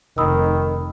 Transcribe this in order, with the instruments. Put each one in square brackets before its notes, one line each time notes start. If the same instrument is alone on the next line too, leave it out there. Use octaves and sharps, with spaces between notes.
[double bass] F1 [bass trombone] D#3 [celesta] B5 D#6 E6